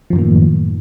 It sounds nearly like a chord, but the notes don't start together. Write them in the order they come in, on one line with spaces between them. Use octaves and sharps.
F3 F#2 D#3 A#3 A2